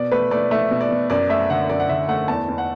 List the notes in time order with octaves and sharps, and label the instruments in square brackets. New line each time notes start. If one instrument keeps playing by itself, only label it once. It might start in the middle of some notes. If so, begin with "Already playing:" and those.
Already playing: [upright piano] B2 D5
A3 B4
A3 D5
A3 E5
B2
D5
B2
F#2 D5
A3 E5
D3 F#5
F#2 D5
F#5
D3 E5
A3 F#5
E2 A5
E2
F#5